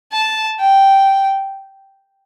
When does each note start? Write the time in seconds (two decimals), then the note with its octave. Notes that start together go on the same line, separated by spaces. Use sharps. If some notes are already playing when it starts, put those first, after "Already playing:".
0.12 A5
0.59 G5